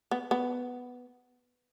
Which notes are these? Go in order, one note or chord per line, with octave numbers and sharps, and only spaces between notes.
B3
B3